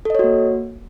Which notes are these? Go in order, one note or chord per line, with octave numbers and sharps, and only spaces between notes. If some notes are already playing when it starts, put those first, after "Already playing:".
A#3 F#4 A4 C#5 D#5